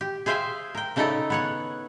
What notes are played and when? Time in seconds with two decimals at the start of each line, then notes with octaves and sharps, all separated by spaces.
0.01 G4
0.26 G#4 C5 E5 F5 G5 G#5
0.75 A#4 G5
0.96 C#3 C#4 D#4 E4 A4 D5
1.30 B3 C#5 F#5